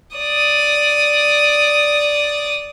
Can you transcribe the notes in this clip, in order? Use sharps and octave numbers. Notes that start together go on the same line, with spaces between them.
D5 D#6